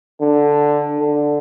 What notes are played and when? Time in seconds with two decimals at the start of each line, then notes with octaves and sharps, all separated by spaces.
0.20 D3
0.98 D3